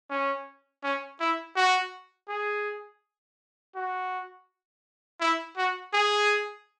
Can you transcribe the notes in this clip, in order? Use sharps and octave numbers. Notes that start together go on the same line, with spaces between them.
C#4
C#4
E4
F#4
G#4
F#4
E4
F#4
G#4